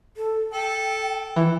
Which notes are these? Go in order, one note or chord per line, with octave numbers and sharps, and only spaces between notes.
A4
A4 G5
E3